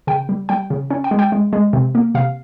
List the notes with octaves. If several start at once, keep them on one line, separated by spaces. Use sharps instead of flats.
C#3 G5
G3
G3 G5
C#3
C#4
G5
G#3
G5
G#3
G#3
C3
A#3
C3 F5